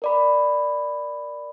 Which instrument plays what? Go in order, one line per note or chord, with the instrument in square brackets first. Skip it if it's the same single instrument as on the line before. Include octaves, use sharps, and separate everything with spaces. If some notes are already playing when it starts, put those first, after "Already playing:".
[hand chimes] A#4 D5 B5